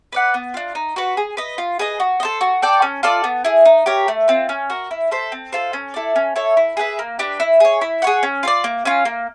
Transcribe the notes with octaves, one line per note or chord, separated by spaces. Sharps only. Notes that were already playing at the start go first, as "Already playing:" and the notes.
B4 D5 F#5
B3
D4 F4
D#4
F#4 B4
G#4
B4 D#5
F4
G#4 B4 D#5
F#4
D#5
A4 C5
F#4
A4 D5 G5
C#4
F4 A4 D5
B3
E4 G#4
D#4
G4 A#4 C#5
A3
C4 F4
C#4
F#4 A#4
E4
A4 C5 E5
C4
F4 A4 C5
C#4
E4 A4 D5
C#4
E4 A4 C#5
E4
G#4 B4 E5
A#3
D4 G4 B4
E4
G#4 C#5
E4
G#4 C#5 F#5
C#4
F4 A4 D5
A#3
C#4 F4
A#3